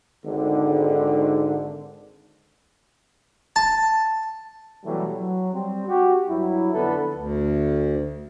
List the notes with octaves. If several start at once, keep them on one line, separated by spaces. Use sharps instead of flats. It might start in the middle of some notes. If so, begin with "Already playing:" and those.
G#1 G#2 D3
A5
B2 E3 F#3 G3 A3
F#3
G3 C4
F#4 G4
G2 F#3 E4
F2 D3 B3 A4 B4
D2